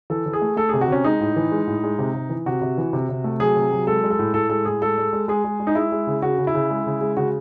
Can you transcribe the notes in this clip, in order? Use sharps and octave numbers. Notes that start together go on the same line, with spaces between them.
E3 A4
E3
G#4
A3
A3 A4
C3 G#4
F#4
C3 C#4
G#3 D#4
A2
E3
G#3
A2
G#3
C3
C3
E3
C3 F#4
C3
E3
C3
C3
A3
F#3 G#4
C3
F#3
G#3 A4
G#3
A4
A2
A2 A4
G#3 A4
A2 G#4
G#3 A4
G#3
G#3
G#3 G#4
G#3
G#3
D#4
G#3 E4
G#3
C#3
C#3 F#4
C#3
E4
C#3
G#3
C#3
G#3
C#3 F#4